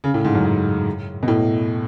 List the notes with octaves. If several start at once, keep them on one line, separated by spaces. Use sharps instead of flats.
C#3
A2
G#2
F#2
G#2
B2
A2